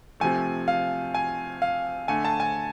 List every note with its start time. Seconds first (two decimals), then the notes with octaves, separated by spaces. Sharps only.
0.20 C3 F3 A3 G#5
0.68 F5
1.14 G#5
1.62 F5
2.08 D3 A3 G#5
2.25 A5
2.40 G#5